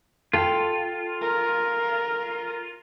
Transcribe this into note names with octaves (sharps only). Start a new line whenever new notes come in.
F4 A4 G5
A#4